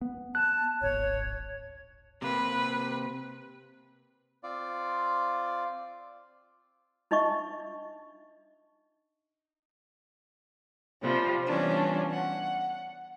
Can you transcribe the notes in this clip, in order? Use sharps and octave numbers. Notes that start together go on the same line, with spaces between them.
B3
A5 F#6
D1 G#1 C#5
C3 A#3 C4 B4
C4 F4 D5
D4 D#4 D#5 E5 C#6
C3 F3 G3
E3 G3 B3 C#4 D4 F4
F#5